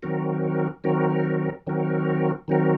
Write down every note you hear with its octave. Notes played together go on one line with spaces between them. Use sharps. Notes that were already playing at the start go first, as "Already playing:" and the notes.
D#3 F#3 C4 F#4 A#4
D#3 F#3 C4 F#4 A#4
D#3 F#3 C4 F#4 A#4
D#3 F#3 C4 F#4 A#4